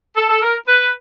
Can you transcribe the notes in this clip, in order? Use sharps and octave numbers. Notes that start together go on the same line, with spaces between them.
A4
A4
A#4
B4